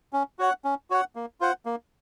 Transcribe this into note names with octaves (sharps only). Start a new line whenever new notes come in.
C#4
F#4 C#5 F#5
C#4
F#4 C#5 F#5
A#3
F4 C5 F#5
A#3